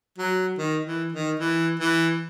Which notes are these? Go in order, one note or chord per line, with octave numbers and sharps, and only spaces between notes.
F#3
D#3
E3
D#3
E3
E3